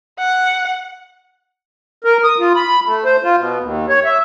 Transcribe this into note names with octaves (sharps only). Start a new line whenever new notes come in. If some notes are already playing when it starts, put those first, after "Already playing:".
F#5
A#4
D#6
F4
B5
A3
C5
F4
B2
D#2
C#5
E5